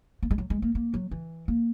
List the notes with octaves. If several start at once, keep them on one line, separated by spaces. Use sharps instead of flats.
A#3
G#3
F#3
G#3
A#3
A#3
F#3
E3
A#3